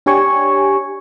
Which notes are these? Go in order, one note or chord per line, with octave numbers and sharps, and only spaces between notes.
D4 G4 C#5 G#5 C#6